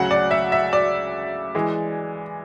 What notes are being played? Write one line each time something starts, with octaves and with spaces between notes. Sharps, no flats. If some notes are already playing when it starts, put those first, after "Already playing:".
Already playing: D2 C#3 F#3 F#5
D5
E5
E5
D5
E3 G#3